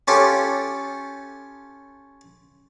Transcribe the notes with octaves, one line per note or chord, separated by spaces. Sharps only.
C#4 F4 G4 A4